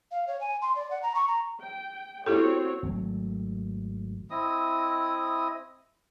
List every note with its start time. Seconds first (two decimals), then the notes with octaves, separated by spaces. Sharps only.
0.11 F5
0.27 C#5
0.41 G#5
0.62 C6
0.76 D5
0.91 F#5
1.03 A#5
1.15 C#6
1.28 A#5
1.63 G5
2.26 C4 E4 F#4 G4 A4 C#5
2.83 G#1 F#3 A3
4.31 C4 E4 D#5 D#6